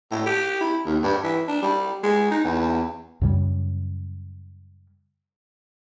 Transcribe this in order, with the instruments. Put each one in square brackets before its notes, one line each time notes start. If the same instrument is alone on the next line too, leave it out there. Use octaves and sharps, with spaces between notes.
[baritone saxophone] A2
G4
E4
D#2
G2
E3
D4
G3
G#3
D#4
E2
[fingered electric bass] F#2 C#3 G3